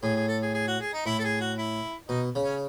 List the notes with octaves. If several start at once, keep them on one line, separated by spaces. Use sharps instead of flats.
A2 G#4
G#4
A4
G#4
G#4
F#4
G#4
D#4
A2 E4
A4
G#4
F#4
E4
B2 D#4
C#3
C#4